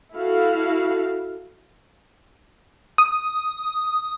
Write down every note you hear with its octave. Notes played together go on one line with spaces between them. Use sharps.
E4 F#4 A4 F5
D#6